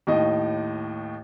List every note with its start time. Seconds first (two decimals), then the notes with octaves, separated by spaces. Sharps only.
0.07 D#2 A2 D#5